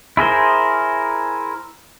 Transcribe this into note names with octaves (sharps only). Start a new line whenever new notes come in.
E4 G#4 A#4 C5